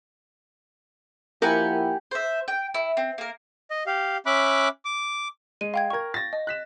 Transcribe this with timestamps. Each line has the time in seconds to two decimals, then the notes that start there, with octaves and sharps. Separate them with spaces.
1.42 F3 A#3 E4 G4 A#4 F#5 G#5
2.11 C5 E5
2.48 G5
2.74 E4
2.97 C4
3.18 A#3 A#4
3.71 D#5
3.87 G4 F5
4.26 C#4 E5 B5 D6 F#6
4.85 D6
5.61 G#3 D#7
5.74 F5 G5 G#6
5.90 A#4 F5 C#6 G#6
6.14 A6 A#6
6.33 D#5
6.47 F#6 B6 E7